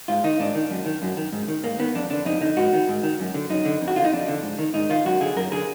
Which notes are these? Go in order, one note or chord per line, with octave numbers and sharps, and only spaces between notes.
G#2 F4
D#3 D#4
G#2 D4
D#3
F#2
D#3
F#2
D#3
G#2
D#3
G#2 A#3
D#3 B3
F2 D4
D3 D4
F2 D#4
D3 D#4
G#2 F#4
D#3
G#2
D#3
F#2
D3
F#2 D#4
D3
F2
F#4
D3 F4
D#4
F2 D4
D3
G#2
D#3
G#2 D#4
D#3 F4
F#2 F#4
D3 G#4
F#2 A#4
D3 G#4